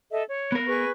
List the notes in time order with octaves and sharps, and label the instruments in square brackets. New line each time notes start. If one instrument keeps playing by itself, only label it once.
[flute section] A4 D#5 E5
C#5
[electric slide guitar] B3 A#4
[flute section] G#4 B4 C#6